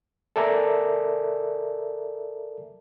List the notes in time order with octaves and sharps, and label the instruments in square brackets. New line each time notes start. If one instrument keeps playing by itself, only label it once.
[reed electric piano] A4 A#4 D5 E5 G#5 A#5